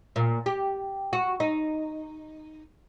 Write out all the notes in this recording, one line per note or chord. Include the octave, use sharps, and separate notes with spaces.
A#2
G4
F#4
D#4